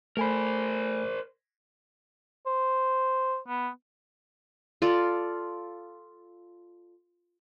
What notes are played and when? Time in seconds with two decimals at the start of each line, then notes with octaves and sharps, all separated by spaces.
0.17 A3 A#4 C5 G#5 B5
2.46 C5
3.48 B3
4.82 F4 A4 D5